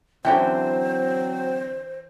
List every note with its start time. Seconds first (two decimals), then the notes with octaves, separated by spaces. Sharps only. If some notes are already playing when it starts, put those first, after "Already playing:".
0.25 D3 E3 F#3 C4 C#4 C5 G5